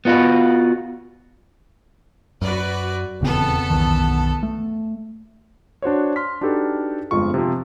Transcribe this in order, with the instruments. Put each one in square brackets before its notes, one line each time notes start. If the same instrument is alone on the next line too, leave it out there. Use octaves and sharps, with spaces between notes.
[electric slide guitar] B3 F4 F#4 B4
[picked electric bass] F#2 [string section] F#4 B4 D5
[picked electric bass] D#1 C#3 C4 [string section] E2 B3 A4
[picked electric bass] B1 F#2 D#3
A3
[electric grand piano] D4 F#4 C5 C#5
C6 F6 B6
D4 D#4 F#4 G4 A4 B4
G1 F2 G#3 F4 C#6
C3 F3